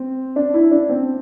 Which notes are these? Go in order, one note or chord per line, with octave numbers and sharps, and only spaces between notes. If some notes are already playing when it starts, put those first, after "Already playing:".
Already playing: C4
D4
E4
D4
C4